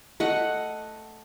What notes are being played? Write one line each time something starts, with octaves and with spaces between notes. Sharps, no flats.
A3 D#5 F#5